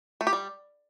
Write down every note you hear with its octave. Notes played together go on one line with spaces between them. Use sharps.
A3
G4
G3